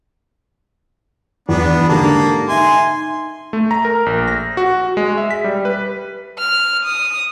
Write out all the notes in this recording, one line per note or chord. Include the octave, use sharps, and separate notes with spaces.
E2 B3 D4
G#2 D3 A#3 G4 A5 A#5
D#4 E5 G#5 C6
A3
A#5
A#4
A#1
A#6
F#4
G#3
E5
B6
G3
B4
F6
D#6